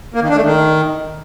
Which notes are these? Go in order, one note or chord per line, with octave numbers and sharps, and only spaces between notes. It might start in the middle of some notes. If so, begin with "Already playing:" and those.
A#3
D#3
D4
A3
D#3